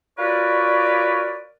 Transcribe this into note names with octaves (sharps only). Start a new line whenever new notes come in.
F4 F#4 A#4 B4 C#5 D5